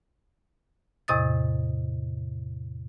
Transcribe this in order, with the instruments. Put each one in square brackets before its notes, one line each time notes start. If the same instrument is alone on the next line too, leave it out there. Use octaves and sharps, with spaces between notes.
[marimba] E2 A2 C3 D#5 D#6 A6